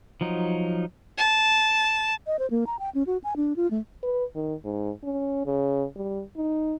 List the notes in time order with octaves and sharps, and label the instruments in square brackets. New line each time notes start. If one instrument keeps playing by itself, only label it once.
[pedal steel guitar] F3 F#3 D#4
[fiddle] A5
[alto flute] D#5
C5
A#3
A#5
G5
C#4
F#4
G#5
D4
F4
A3
[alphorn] B4
D#3
G#2
C#4
C#3
G3
D#4